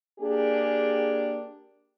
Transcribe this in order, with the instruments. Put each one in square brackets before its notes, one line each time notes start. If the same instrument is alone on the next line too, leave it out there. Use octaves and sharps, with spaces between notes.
[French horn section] A#3 D4 G4 G#4